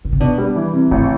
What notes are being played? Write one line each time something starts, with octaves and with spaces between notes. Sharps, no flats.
D3
C3
B2 D4
G3
E3
C3
A1 G2